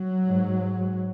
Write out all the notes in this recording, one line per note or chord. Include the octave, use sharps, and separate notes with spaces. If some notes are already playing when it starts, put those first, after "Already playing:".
Already playing: F#3
G#2